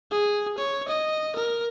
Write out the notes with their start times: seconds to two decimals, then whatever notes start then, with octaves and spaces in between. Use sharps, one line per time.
0.11 G#4
0.58 C#5
0.88 D#5
1.36 A#4